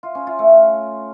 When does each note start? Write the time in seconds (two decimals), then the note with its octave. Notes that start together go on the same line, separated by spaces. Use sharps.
0.03 F4
0.15 C#4
0.27 F4
0.39 A3